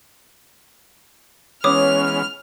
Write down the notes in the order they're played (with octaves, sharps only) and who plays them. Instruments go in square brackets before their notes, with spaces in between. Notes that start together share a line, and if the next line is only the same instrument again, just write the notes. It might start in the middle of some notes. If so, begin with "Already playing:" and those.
[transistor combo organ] E3 G#3 B3 [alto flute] C#4 [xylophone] C#5 D6 D#6 [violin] F6